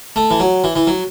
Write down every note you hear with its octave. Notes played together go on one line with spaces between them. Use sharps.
A3
E3
F#3
E3
E3
F#3